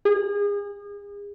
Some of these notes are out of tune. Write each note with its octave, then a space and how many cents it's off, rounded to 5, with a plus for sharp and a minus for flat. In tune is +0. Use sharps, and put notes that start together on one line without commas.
G#4 -35